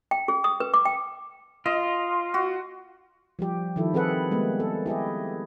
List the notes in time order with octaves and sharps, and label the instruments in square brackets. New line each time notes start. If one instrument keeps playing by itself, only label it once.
[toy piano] G5
G#4
D#6
B4
D6
G5
[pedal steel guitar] F4 [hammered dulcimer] D#5
[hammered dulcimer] F#4
[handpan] F3 G3 G4
D#3 F3 E4 A4
D#3 C4 G#4 A4 B4 F#5
G3 G#3 A#3 B3
A4
E4 G4 G#4 D#5